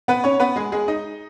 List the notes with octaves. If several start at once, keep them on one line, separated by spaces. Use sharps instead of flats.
B3 B4
C#4 C#5
B3 B4
G#3 G#4
G#3 G#4
D#4 D#5